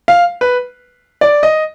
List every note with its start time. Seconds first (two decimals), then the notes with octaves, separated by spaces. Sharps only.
0.08 F5
0.41 B4
1.21 D5
1.43 D#5